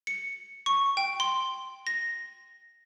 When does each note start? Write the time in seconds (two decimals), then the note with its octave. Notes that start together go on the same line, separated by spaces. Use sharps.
0.07 C#7
0.66 C#6
0.97 G5
1.20 C6
1.87 A#6